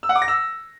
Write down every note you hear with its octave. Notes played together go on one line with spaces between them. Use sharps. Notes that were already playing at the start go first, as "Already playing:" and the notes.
E6
F#5
D6
A#6
E6